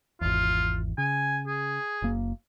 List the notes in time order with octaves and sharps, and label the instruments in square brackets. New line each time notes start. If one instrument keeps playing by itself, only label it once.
[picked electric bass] G#1 E2 [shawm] F4
[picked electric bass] C#3 [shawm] G#5
[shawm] G#4
[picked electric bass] F#1 A#3